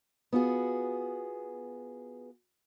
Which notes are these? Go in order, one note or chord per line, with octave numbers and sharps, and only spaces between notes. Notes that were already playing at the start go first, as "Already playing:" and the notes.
B3 F4 F#4 G#4